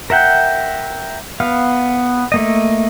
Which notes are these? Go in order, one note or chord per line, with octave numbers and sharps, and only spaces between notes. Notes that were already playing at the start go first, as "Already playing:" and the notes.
A#4 E5 F#5 G5
B3 F5 F6
A3 A#3 D#5